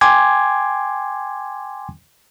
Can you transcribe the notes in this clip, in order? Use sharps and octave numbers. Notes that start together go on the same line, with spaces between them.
G5 G#5 C6 D6 G#6